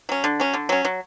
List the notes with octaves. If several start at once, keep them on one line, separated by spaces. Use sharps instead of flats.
F#3 C#4
D3
F#3 C#4
D3
F#3 C#4
F#3